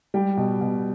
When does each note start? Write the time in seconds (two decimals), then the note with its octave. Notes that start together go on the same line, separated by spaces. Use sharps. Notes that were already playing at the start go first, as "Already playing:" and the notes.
0.14 G3 G5
0.37 B2
0.61 B2